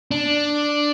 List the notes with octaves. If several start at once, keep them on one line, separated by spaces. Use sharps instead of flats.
D4